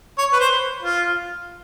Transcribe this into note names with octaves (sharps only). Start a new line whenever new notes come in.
C#5
B4
C5
F4